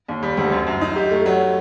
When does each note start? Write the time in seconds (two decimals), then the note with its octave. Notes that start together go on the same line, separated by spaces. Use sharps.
0.08 D#2
0.23 G3
0.37 D2
0.52 F#2
0.67 F#2
0.81 D#4
0.96 G4
1.11 A3
1.26 F#3